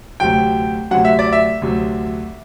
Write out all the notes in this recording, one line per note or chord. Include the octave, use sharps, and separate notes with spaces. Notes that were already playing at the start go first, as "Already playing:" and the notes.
D2 C3 F#3 G5
D2 C3 F#3 F#5
E5
D5
E5
D2 C3 F#3